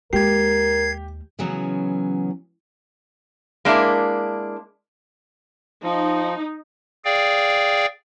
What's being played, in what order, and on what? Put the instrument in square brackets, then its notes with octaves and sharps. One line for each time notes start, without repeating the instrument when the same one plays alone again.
[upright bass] D#2 G#3 [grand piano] G4 [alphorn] A#4 [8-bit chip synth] G#6 C7
[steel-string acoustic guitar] C#3 E3 F#3 B3 C#4
[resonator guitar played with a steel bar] G#3 A#3 D4 E4
[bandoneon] F3 [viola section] D#4
[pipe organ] G#4 D5 F5 G5